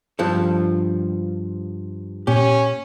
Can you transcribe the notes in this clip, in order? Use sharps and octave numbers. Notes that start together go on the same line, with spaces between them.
G2 F3 A4
A#2 B3 C#4 G4